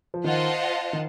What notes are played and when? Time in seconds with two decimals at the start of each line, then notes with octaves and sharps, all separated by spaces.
0.14 F3
0.24 D#3 F4 C5 D#5 F#5 A5
0.93 D#3